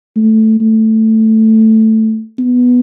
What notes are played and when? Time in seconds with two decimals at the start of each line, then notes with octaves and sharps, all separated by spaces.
0.16 A3
0.60 A3
2.39 B3